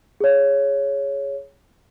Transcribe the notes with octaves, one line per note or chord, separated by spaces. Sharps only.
G#4 C#5